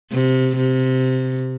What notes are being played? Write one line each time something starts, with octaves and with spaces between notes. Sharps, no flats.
C3
C3